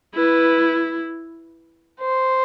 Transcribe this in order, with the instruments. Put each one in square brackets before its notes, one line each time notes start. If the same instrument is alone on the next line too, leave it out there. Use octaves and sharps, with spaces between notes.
[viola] E4 [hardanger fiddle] B4
[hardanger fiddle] C5